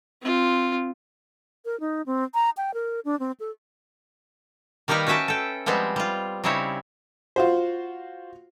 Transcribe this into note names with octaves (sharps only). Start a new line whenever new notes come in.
C4 F4
A#4
D#4
C4
A#5
G5
A#4
D4
C4
A4
D#3 G3 A#3 D#4 A#4 B4
C#4 F#4 B4 E5 G5 A5
A4 G5
F3 G3 G#3 B3 C4
G3 F4
C#3 G3 C4 D#4 E4 C#5
F4 F#4 C5